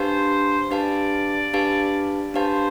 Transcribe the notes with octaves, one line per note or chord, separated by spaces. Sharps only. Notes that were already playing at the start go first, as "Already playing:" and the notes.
Already playing: D4 G4 B4 C5 F5 A5
D4 G4 B4 D5 F5 A5
D4 G4 B4 F5 A5
D4 G4 B4 C5 F5 A5